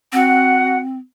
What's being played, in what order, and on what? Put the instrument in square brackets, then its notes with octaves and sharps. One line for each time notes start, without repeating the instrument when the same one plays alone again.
[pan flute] C4 [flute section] F#4 F#5